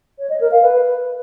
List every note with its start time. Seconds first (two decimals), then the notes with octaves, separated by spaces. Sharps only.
0.19 C#5
0.29 D#5
0.40 A#4
0.51 F5
0.62 B4